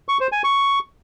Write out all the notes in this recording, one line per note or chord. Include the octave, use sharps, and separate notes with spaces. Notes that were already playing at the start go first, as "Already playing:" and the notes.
C#6
C5
G#5
C#6